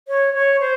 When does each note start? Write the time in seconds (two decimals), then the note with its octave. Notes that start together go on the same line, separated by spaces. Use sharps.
0.08 C#5
0.34 C#5
0.60 C5